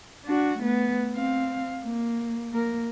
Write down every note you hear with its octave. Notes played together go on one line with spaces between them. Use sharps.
D4 F#4
A3 B3
C4 F5
A#3
A#3 A#4